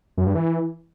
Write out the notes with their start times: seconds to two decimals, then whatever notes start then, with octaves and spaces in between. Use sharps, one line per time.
0.17 F#2
0.26 G2
0.35 E3